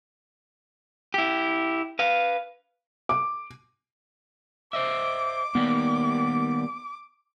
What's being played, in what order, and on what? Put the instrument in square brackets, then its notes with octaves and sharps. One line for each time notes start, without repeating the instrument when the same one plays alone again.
[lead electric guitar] E4 G4
B4 F5
[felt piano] D6
[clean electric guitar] C5 D#5 E5 [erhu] D6
[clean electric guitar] D#3 G3 A#3 [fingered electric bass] B3